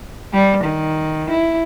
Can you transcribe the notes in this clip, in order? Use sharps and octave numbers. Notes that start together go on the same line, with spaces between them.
G3
D#3
E4